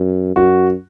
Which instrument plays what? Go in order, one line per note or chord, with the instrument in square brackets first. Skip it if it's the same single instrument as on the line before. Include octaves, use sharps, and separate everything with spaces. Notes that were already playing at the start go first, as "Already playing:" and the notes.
Already playing: [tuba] F#2
[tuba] F#2 [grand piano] F#4